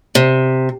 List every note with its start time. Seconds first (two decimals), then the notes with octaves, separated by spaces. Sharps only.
0.15 C3